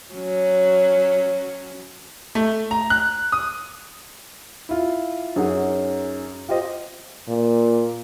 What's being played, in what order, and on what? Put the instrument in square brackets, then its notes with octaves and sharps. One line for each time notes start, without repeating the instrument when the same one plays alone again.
[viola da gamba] F#3 C#4
[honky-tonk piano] A3
A#5
F#6
D#6
[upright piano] E4 F4
F#2 C#4 D#4 G#4 F#5
F4 G4 C5 D#5
[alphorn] A#2